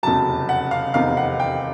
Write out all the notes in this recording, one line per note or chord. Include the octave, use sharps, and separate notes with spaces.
F1 E2 C#3 F#3 A5
F#5
F5
F1 E2 C3 D#3 F5
F#5
G5